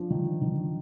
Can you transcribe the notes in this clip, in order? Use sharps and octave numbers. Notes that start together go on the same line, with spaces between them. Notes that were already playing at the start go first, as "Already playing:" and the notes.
Already playing: F3 D4
D#3
D#3